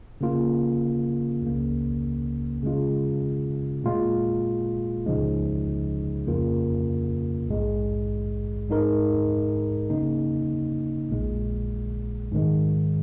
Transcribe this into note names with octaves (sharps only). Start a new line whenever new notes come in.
C#3 A#3 F4
C#2 C#3 A#3
C#3 G#3 F4
A#2 G#3 F4
C#2 C#3 F3 G#3 D#4
F2 C#3 A#3 F4 A#4
A#1 G#2 G#3
G#2 G#3 D#4 A#4
C#3 A#3 D#4
A#1 A#2 G#3
G#2 D#3 G#3